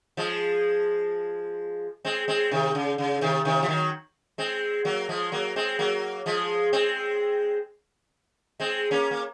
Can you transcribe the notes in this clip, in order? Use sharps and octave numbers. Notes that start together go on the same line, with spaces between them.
F3 G#3
G#3 C4
G#3 C4
C3 D#3
C#3
C#3
C3 D#3
C3 D#3
F3
D#3 F#3
G#3 C4
F#3 A#3
F3 G#3
F#3 A#3
G#3 C4
F#3 A#3
F3 G#3
G#3 C4
G#3 C4
A#3 C#4
A#3